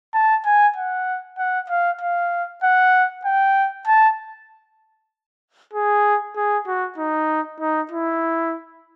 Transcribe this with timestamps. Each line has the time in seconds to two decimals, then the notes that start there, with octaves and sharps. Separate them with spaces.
0.14 A5
0.45 G#5
0.76 F#5
1.38 F#5
1.70 F5
2.01 F5
2.63 F#5
3.25 G5
3.87 A5
5.73 G#4
6.36 G#4
6.67 F#4
6.98 D#4
7.60 D#4
7.91 E4